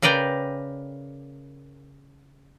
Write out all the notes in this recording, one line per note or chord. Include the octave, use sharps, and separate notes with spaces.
C#3 A#4 B4 D5 G5